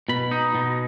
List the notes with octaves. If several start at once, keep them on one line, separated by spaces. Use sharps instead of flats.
B2 B5
D#4
B2